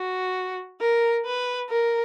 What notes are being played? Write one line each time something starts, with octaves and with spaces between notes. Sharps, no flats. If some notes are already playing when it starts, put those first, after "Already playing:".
Already playing: F#4
A#4
B4
A#4